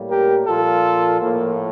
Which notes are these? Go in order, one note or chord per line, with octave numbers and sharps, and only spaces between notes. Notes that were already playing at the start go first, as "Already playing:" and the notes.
Already playing: A2 G3 A#3
G4 A#4
A#2 F3 A#3 F4 A4
A2 F3 A#3